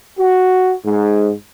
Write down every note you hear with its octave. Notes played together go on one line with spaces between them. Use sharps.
F#4
G#2